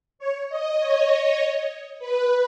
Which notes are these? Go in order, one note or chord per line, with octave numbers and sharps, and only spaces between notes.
C#5
D#5
C#5
B4